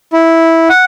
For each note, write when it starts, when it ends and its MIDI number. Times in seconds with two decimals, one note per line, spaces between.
0.13 0.69 64
0.69 0.85 78